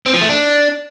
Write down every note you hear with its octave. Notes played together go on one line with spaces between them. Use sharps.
C4
F3
A3
D4